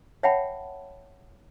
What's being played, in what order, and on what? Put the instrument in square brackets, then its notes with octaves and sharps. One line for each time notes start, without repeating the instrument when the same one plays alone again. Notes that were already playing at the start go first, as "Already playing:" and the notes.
[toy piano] C#5 E5 F#5 G5 A5 B5